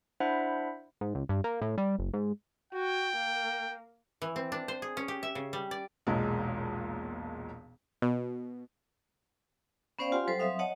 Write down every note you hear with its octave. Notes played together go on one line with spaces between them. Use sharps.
D4 E4 C5 E5 F#5 B5
G#2
C#2
G2
A#3
A2
G3
F#1
G#2
F#4 G5
A#3
E3
C4
D4
C5
G#4
C#4
G4
E5
C#3
G3
D5
E1 B1 A#2 G#3
B2
B3 C#4 C5 D5 F5 G5
F4 G4 F5 F#5 G#5 C6
F#3 G3 A4 C5
F#3 C4 E5 F5 D#6
C#5 D#5 F#5 A5